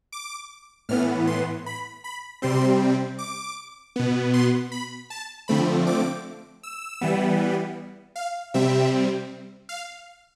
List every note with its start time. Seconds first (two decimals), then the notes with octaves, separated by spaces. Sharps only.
0.12 D6
0.89 A2 E3 B3 F6
1.27 C6
1.66 B5
2.04 B5
2.42 C3 G3 C4 C6
3.19 D6
3.96 B2 B3
4.34 C6
4.72 B5
5.10 A5
5.48 D3 F3 A3 C4 B5
5.87 D6
6.63 E6
7.01 E3 G3 B3
8.16 F5
8.54 C3 G3 C4 E5
9.69 F5